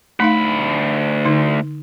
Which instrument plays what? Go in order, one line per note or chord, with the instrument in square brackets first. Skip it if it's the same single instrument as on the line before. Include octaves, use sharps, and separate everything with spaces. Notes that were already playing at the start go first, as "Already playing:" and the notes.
[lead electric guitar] D2 B5 [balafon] A3 D#4 F5
[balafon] D3 D#4